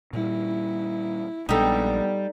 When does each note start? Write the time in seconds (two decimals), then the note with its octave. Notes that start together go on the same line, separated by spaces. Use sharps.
0.13 A#2 G3 E4
1.49 A#1 G3 G#3 B3 D4 D#4 G4 A4